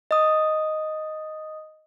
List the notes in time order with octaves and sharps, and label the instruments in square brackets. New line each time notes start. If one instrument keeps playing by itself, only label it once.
[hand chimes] D#5 D#6